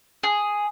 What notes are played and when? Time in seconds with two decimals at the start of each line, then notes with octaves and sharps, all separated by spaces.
0.23 G#4